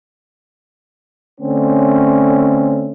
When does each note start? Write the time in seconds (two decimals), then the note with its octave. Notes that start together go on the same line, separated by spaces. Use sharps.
1.40 D3 A3 C4 C#4